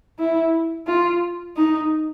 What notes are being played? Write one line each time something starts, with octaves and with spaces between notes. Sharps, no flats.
E4
F4
D#4